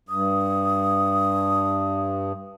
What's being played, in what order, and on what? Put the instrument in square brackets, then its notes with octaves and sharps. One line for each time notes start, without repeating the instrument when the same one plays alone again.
[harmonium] G2 [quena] D#6